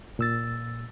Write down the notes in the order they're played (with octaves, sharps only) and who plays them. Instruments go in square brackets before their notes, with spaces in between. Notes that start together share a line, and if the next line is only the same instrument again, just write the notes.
[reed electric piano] A#2 E6 A6